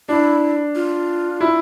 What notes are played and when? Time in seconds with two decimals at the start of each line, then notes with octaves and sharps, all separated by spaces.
0.09 D4 E4
0.75 F4
1.40 E4